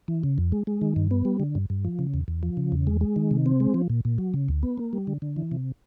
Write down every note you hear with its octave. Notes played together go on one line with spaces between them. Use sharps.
E3
C#3
F2
G#3
G#3
D#3
G2
B3
G3
D3
G2
G2
F3
C#3
E2
E2
F3
C#3
E2
G#3
G#3
D#3
C3
C4
G#3
F3
A#2
A#2
F#3
C#3
D2
B3
A#3
G3
D3
D3
E3
C3